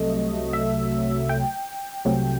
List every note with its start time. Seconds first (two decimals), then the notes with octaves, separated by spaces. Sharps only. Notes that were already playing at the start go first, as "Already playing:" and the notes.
Already playing: C2 C3 F#3 A3 D#5
0.53 E5
1.29 G5
2.05 C2 C3 F#3 A3